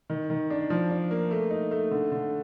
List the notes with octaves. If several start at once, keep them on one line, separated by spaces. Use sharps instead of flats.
D#3
D#3
D4
F3
D4
A#3
A3
D#4
A3
D3
D3